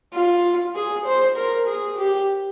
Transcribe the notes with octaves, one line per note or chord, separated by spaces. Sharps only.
F4
G#4
C5
A#4
G#4
G4